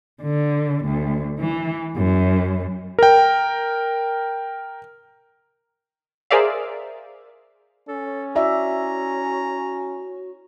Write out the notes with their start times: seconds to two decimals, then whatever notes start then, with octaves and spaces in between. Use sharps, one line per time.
0.21 D3
0.84 D2
1.39 E3
1.96 F#2
2.99 A#4 G5
6.31 G#4 A#4 C5 D5 E5 F5
7.88 C#4 A4
8.35 E4 F#4 D5 E5 A#5